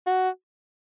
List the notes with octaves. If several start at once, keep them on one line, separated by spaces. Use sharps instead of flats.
F#4